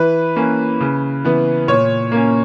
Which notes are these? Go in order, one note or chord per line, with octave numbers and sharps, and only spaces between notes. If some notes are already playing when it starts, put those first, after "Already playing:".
Already playing: E3 B4
A#3 C#4
C#3
E3 B3
A#2 C#5
A#3 C#4